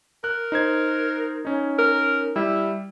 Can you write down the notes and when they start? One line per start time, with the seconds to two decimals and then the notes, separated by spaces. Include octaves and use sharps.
0.24 A#4 F#6
0.52 D#4 C5 G#6
1.45 C#4 D#4
1.79 A#4
2.36 G3 E4